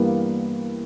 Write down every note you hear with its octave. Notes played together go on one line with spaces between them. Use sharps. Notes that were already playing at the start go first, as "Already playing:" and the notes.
Already playing: G2 E3 G3 A#3 B3